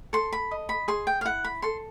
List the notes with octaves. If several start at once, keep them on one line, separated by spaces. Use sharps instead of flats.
A4 C6
B5
D#5
B5
G#4 C6
G5
F5
E4 F#5
B5
A4 C6